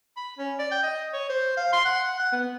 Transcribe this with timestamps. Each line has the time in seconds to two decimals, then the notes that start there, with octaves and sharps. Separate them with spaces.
0.17 B5
0.38 C#4
0.59 D5
0.71 G5
0.83 D#5
1.13 C#5
1.29 C5
1.57 F5
1.73 C6
1.85 F#5
2.20 F#5
2.32 B3